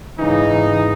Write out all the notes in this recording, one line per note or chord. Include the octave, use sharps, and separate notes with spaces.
G#2 C#3 E3 D#4